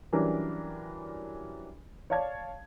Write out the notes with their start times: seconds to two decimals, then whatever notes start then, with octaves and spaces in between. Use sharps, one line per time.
0.13 E3 F#3 G3 C#4 D4 A#4
2.10 C#5 D5 F5 A5 G#6